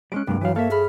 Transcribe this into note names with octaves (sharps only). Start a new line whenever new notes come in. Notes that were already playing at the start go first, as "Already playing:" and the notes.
G3 G#3 C#4 F#6 D7
C2 G2 F#3 G#3 A#3
E3 F#3 F5
A#3 A4 C#5 E5 F5
G#4 B5 F6